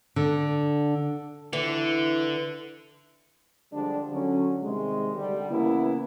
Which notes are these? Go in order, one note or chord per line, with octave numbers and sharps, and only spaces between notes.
D3
D3 E3
D3 F3 G3 G#3 D4
D3 F#3 C#4
C3 D#3 G3 G#3
D3 G3
C#3 E3 A#3 B3 E4